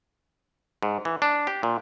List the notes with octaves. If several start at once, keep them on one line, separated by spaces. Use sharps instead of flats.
G#2
E3
D4
G4
A#2